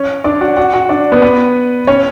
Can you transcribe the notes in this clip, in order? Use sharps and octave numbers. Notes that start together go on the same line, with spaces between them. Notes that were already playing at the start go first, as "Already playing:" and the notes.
Already playing: C#4 C#5
D4 D5
F#4 F#5
F#4 F#5
F#4 F#5
D4 D5
B3 B4
B3 B4
C#4 C#5